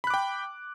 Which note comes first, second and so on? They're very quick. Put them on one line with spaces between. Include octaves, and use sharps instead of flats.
B5 F#6 D6 G5